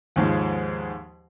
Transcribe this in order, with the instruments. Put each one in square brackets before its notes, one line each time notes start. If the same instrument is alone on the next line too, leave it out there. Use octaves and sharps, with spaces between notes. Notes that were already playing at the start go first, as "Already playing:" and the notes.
[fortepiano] D#2 G#2 F3 G#3